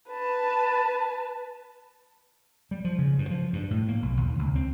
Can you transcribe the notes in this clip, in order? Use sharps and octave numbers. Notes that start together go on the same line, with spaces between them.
B4 A5
G3
F3
C#3
G2
F3
G2
A2
A#3
B1
D#2
C#2
C4